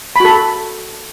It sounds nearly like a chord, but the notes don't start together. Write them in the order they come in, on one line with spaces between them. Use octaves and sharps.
B5 F#4 A4